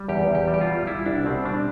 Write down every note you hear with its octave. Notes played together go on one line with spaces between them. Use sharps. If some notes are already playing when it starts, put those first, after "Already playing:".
Already playing: G3
E2 G4
E2
G4
G3
G4
F4
G3
G3 E4
C2 D4
B2 C4
G3 D4